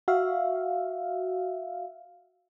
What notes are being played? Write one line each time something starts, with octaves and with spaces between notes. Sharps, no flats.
F#4 E5 F5